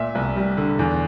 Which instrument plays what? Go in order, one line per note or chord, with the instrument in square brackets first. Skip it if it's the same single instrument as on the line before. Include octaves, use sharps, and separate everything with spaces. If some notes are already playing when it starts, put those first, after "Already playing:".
Already playing: [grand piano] A#2 E5
C2
G3
D3
E2